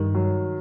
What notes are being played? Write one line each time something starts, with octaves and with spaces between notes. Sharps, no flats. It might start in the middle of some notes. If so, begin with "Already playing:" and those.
Already playing: G2 D#3 G3
F#3